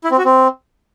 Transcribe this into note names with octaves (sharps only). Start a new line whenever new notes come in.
E4
C4
F#4
C4